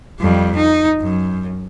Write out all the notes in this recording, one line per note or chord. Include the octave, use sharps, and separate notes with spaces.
F2 G3
D#4
F#2